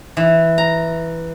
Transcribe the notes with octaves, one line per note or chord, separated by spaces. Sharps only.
E3
A#5